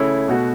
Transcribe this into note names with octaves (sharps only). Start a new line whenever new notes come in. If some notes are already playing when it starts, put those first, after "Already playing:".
Already playing: C#3 A3 E4 C#5
B2 A3 F#4